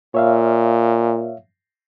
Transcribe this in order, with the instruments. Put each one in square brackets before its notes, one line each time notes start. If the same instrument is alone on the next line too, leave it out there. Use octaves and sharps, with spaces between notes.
[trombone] A#2 [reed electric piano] C#5 E5 F5